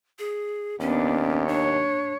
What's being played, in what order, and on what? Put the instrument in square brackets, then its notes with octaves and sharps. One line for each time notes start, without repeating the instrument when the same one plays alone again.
[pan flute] G#4
[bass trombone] D#2 [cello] B3 D4 [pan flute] C#4
[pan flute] D4 [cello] C#5